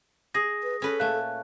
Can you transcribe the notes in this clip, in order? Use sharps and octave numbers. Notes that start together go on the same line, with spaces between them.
G#4 D#6 A#6
B4
C#4 A4 B4
A#2 A3 F5 F#6